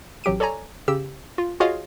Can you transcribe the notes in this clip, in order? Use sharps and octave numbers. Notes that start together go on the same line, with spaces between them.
A1 F#3 G4 D7 D#7
A4 C#5 D5 G#5 A#5
C#3 G4 E6 E7
F4
F4 F#4 G#4 C#5 D#5 F5